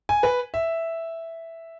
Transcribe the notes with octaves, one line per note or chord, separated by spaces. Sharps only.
G#5
B4
E5